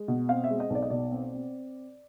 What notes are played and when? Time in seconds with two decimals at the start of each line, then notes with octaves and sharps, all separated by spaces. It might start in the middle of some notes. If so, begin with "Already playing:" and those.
Already playing: G#3
0.08 B2
0.29 C4 F5
0.44 E5
0.50 G#3
0.60 D#5
0.70 B1 D5
0.82 D#5
0.90 B2 D5
1.12 C4
1.34 C4